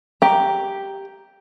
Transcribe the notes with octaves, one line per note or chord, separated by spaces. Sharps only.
G4 A#5